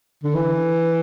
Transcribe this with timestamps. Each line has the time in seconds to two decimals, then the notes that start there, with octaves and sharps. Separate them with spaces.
0.23 D3
0.34 E3